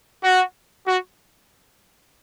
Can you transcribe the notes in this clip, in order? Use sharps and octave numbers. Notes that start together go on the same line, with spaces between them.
F#4
F#4